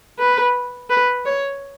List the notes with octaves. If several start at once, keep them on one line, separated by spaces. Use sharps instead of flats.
B4
B4
C#5